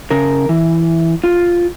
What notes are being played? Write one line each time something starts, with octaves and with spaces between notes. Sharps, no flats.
C#3 A#4
E3
F4